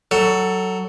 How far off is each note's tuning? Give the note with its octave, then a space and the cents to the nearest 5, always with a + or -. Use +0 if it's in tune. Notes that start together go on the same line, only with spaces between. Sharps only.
F#3 +15 A4 +15